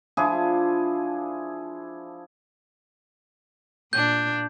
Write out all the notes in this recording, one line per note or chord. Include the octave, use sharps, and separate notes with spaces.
F3 D4 E4 G#4
A#2 D4 G6